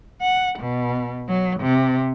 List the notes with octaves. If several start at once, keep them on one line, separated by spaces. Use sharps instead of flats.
F#5
B2
F#3
C3